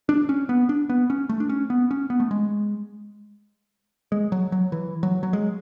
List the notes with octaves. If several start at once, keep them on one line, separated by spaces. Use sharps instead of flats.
D4
C#4
B3
D4
B3
C#4
A3
D4
C#4
B3
C#4
B3
A3
G#3
G#3
F#3
F#3
E3
F#3
F#3
G#3